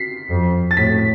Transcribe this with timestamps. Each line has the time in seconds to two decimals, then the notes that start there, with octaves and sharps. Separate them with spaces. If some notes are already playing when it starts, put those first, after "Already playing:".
Already playing: B6 C7
0.30 F2
0.71 A6
0.77 A2 B6